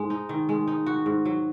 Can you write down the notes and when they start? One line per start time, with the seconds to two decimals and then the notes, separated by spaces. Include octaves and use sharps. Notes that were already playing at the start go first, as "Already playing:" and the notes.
Already playing: G#2 G#3
0.10 D#4
0.29 D#3
0.49 G#3
0.67 D#4
0.86 F#4
1.06 G#2
1.25 F#3